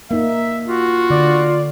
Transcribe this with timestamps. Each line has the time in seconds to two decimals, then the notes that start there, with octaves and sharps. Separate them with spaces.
0.11 A#3 D#4 A#4 E5
0.68 F4 F#4
1.10 D3 D5